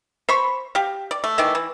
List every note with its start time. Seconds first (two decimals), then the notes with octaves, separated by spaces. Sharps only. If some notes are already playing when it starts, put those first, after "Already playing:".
0.29 C5 B5 C#6
0.75 G4 F5
1.11 D5
1.24 A3
1.38 D#3 E3 A3 D5
1.55 E3